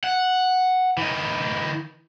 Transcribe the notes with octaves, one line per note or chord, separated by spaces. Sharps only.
F#5
E3 D#4